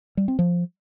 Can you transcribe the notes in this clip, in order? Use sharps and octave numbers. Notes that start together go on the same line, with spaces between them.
G3
C4
F3